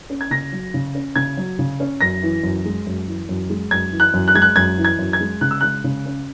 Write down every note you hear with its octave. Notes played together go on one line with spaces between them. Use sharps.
C#4
G#6
C#3 A#6
F#3
C#3
C#4
C#3 G#6
F#3
C#3
C#4
F#2 A#6
E3
F#2
G#3
F#2
E3
F#2
G#3
F#2 G#6
E3
F#6
F#2
F#6
G#3 G#6
F#6
F#2 G#6
E3
G#6
F#2
G#6
G#3
C#3 F#6
E6
G#3 F#6
C#3
C#4